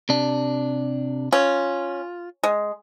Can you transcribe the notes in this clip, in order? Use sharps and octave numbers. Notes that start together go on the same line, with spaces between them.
C3 D4
C#4 F4
G#3